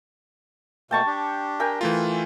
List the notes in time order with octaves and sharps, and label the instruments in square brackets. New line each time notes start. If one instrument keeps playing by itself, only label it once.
[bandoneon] B2 A3 A#3 [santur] G5 A5 C#6
[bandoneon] D4 G4
[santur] A#4 G5 G#5
[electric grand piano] E3 A3 F4